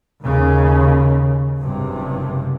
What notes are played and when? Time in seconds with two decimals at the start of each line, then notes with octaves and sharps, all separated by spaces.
0.21 D#2 C#3
1.59 F#1 G2 C3